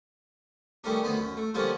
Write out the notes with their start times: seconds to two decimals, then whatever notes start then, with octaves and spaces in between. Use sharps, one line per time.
0.84 D#3 G3 A3 C#4 D4
1.03 D2 D#3 B3 C5 B5
1.19 F#2
1.37 A3
1.54 D3 F3 G3 A#3 C#4 F4